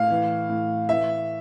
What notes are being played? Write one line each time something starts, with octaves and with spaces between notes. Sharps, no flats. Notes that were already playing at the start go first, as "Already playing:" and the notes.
Already playing: A2 F5
E3
A2
E3 E5